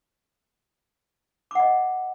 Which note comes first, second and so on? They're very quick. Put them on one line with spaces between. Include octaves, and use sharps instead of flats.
D6 F#5 D#5